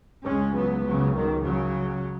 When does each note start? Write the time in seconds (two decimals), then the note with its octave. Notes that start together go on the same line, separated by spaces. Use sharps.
0.25 C#2 C#3 G#3 C#4
0.55 F#3 B3
0.85 C#3 F#3
1.15 D#3
1.44 C#3 F#3